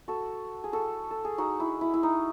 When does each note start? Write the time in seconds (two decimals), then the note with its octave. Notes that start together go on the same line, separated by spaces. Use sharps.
0.08 F#4 A4
0.64 G#4
0.73 F#4 A4
1.11 A4
1.25 G#4
1.38 D#4 F#4
1.60 E4
1.81 E4
1.94 E4
2.03 D#4